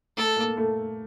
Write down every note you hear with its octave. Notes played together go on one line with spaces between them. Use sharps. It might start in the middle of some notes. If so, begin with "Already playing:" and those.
A3 A4
A#3
A3